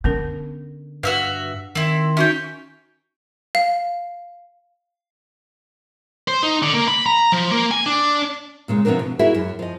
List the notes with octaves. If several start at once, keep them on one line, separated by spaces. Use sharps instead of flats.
D3 B3 C#4 A#4
G2 F#4 B4 E5 F5
D#3 C4 E4
C#4 D#4 F#4 C#5 E5 G5
F5
C5
D#4
D3
A#3
B5
A#5
F3
A#3
G#5
D4
A#2 C#3 G#3
C3 F3 B3 C4 D4 A#4
B2
E4 F#4 G#4 A#4 E5
F#2
F3 D#5